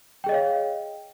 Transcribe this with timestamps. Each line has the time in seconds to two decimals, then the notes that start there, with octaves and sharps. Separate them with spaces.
0.24 G5
0.26 G#4
0.29 D#5
0.32 C#5
0.34 F5